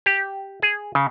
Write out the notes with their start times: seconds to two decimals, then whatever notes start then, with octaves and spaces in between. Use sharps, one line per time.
0.06 G4
0.62 G#4
0.95 C#3